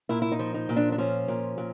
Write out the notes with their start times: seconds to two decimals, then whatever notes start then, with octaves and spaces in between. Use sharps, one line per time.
0.09 A#2 E4
0.22 E4
0.32 D#4
0.39 F3
0.54 D#4
0.69 A#2
0.76 D4
0.92 D4
0.98 F3 C#4
1.28 A#2
1.58 A#2